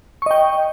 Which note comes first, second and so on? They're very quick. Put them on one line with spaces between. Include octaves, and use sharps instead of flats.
C#6 D#5 G5